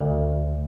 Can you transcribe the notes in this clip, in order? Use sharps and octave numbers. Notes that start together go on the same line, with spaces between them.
D2